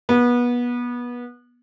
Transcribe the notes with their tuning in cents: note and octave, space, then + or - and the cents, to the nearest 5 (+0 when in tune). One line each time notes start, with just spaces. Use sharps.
B3 -25